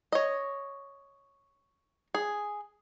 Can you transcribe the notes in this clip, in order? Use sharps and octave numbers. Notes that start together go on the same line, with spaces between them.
C#5 D#5
G#4